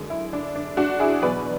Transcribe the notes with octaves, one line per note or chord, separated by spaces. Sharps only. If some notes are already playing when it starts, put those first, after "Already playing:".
Already playing: F#2 D3 G#3
E4
D4
D4
D4 F#4
E4 G#4
E2 B2 F#3 B4 D5